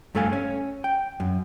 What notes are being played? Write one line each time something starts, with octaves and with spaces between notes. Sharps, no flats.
G2 A3 A4 F5 G#5
C#4
G5
F#2